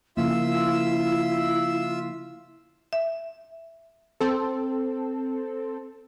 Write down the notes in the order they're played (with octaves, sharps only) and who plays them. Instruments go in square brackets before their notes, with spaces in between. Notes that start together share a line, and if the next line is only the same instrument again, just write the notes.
[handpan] C#3 F3 A#3 [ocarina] E4 [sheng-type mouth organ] F4 E5 E6
[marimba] E5
[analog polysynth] C4 A4